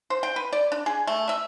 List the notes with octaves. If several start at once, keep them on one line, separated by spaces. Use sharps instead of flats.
C5
G5
B4
D5
D4
G#4
A3
E5